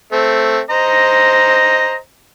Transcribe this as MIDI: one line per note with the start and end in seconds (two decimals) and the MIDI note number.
0.12 0.60 57
0.12 0.60 60
0.70 1.96 72
0.70 1.96 75
0.70 1.96 82